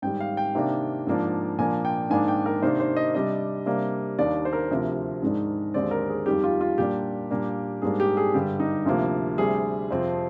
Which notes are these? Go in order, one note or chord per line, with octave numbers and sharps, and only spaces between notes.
G#2 D#3 G3 G5
F5
G5
C3 D#3 A#3 D4
G#2 F3 A#3 D4
A#2 F3 A#3 D4 G#5
G5
G#2 D#3 A#3 D4 G#5
G5
A#4
C3 D#3 A#3 D4 C5
C5
D#5
C3 G3 D4 D#5
C3 G3 A#3 D4
D#2 D#3 A#3 D4 D5
C5
A#4
D2 C3 F3 C4
G#2 D#3 G#3 D4
D#2 D3 G#3 C4 D5
A#4
G#4
F2 D#3 G3 G4
F4
F4
A#2 G3 A#3 D4 G4
A#2 G3 A#3 D4
G#2 G3 A#3 D4 G#4
G4
G#4
G2 D3 G3 G4
D#4
D2 C3 F3 A#3
D2 C3 G3 G#4
F2 C3 F3 C4